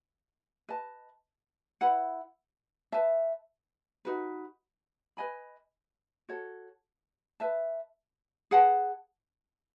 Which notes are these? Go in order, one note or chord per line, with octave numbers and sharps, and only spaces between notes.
B4 D#5 A5
E4 B4 F#5 B5
B4 E5 A5
D#4 F#4 B4
B4 D#5 G#5 B5
F#4 A4 C#5
B4 E5 A5
G#4 B4 F#5 A5